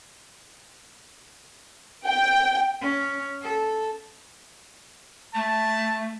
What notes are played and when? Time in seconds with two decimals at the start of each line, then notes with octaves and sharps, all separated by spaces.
2.06 G5
2.81 C#4
3.42 A4
5.35 A3 A5